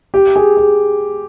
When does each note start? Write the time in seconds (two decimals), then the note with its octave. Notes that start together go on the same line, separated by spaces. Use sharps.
0.14 G4
0.36 G#4
0.57 G#4